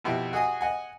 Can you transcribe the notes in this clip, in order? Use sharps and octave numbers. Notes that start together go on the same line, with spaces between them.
F2 B2 E4 G4
F#4 G#4 D#5 G#5 D#6
D#5 F#5 G#5